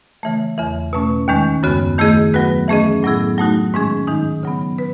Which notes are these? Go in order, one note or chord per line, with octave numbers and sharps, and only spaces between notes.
C#3 E3 A3
E2 C#3 E3
B2 A3 C#4
D#2 D#3 G#3 C#4
F#2 C#3 G#3 B3 F#4
D#3 A3 E4 G#4 D#5
F#3 B3 F#4 B4
E3 A3 C#4 G#4 D#5
A2 F#3 B3 E4 G#4
F#3 A3 D#4 F#4
G#2 D#3 G#3 C#4 G#4
D#3 G#3 D#4
C#3 F#3 B3
B4